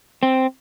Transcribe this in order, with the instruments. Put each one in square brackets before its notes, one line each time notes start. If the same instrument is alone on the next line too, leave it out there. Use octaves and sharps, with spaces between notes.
[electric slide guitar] C4